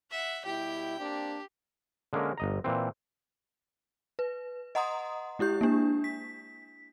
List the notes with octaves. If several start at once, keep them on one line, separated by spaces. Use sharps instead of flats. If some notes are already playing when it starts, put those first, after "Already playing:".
E5 F#5
B2 G3 E4 G4 G5
A#3 C4 D4 G4
D3 G#3 A#3 C#4 A#4
G1 D#5 A#5
A#2 E3 C4
B4
D#5 F#5 A#5 C6 D#6
G#3 E4 G4 G6
A#3 D4
B6